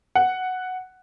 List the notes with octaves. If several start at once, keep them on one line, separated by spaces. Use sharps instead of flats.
F#5